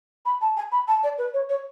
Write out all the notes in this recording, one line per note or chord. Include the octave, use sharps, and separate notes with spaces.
B5
A5
G#5
B5
A5
D5
B4
C#5
C#5